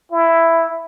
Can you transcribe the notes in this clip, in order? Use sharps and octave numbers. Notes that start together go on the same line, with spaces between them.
E4